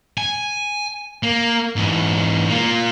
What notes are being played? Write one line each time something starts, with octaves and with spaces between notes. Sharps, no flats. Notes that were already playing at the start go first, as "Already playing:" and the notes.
G#5
A#3
G#2 E3
A#3 F4